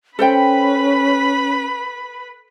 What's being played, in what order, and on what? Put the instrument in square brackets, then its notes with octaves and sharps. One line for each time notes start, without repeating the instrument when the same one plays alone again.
[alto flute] C#4 [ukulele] A4 C5 G5 [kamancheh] B4 B5